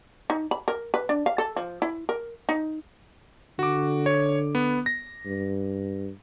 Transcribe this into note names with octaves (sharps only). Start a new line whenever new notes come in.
D#4
B5
A#4
B4
D4
F5
A4
F3
E4
A#4
D#4
D3 F#4 D6
C#5
B3
A#6
G2